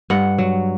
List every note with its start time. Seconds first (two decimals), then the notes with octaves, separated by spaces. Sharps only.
0.10 G2 F#5
0.38 F#3